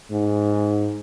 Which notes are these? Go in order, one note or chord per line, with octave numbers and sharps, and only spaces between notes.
G#2